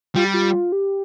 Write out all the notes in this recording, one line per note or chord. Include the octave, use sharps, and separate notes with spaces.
G3 F4
G4
F4
G4